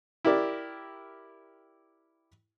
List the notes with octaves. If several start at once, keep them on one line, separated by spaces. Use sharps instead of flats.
E4 G4 A#4 D5